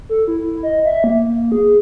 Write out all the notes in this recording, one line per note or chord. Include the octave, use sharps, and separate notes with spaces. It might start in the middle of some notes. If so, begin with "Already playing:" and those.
A4
E4
D#5
E5
A#3
G#4